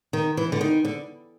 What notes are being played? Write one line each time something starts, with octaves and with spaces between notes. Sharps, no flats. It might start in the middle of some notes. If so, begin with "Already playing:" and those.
D#3
E3
D3
D#3
D3